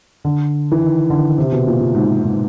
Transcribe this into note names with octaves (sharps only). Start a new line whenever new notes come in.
D3
E3
D#3
D3
C3
B2
A#2
A#2
G#2
G#2